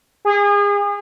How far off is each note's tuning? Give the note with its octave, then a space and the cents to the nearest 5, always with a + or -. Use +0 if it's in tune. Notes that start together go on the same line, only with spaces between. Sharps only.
G#4 -35